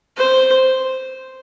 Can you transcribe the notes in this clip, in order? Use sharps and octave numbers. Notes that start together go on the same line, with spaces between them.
C5